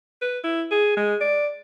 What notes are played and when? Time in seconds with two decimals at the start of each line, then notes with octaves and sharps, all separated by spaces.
0.22 B4
0.44 E4
0.71 G#4
0.97 G#3
1.21 D5